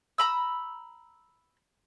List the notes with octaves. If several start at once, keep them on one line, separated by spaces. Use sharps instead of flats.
A#5 B5 E6